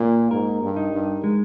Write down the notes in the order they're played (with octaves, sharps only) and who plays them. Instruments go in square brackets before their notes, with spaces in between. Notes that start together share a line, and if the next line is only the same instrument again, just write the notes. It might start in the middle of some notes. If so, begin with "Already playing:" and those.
Already playing: [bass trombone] A#2 [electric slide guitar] A#3
[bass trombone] G#2 [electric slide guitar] A#4
[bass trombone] G2
[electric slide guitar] D#4
[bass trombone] G2
[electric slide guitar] G#3